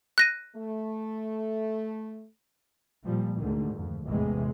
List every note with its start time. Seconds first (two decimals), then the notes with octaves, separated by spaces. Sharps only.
0.18 F#6 A#6 D#7
0.56 A3
3.05 A#2 F3 G3
3.40 D2 G#2 D3 D#3
3.75 F2
4.06 A1 E2 A2 C3 E3 G#3